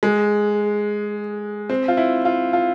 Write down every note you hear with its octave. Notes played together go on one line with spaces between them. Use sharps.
G#3
C4
F4
E4
F4
F4